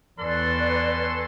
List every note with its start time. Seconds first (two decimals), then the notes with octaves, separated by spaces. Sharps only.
0.20 E2 C#4 A4 B4 D5 C6